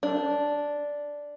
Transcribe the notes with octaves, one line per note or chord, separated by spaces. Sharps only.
D4